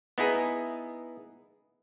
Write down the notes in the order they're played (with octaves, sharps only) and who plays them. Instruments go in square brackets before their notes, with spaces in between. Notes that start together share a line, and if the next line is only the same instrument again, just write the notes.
[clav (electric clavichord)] B3 D#4 E4 G#4